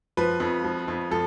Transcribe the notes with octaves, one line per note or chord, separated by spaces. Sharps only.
F3 B4
F2
F3
F2
F3 A4